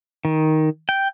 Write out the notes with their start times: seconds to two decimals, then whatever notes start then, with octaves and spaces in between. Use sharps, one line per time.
0.25 D#3
0.89 G5